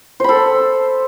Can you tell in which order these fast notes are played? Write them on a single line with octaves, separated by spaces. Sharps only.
C5 B5 A4